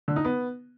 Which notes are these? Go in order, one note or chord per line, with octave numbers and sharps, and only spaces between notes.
D3
D#4
B3